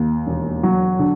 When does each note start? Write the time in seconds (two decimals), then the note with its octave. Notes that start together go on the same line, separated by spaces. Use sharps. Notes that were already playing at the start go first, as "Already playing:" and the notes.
Already playing: D#2
0.27 E1
0.63 F#3
0.99 D3